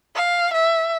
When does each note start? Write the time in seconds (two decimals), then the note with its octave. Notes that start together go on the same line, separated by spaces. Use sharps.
0.15 F5
0.54 E5